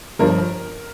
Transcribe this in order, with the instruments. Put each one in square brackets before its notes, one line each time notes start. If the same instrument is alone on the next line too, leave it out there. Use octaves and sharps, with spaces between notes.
[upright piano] G1 G2 F3 A#4